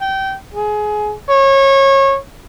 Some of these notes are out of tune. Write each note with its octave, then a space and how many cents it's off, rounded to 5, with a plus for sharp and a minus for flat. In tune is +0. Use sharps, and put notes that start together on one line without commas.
G5 -25
G#4 +20
C#5 -25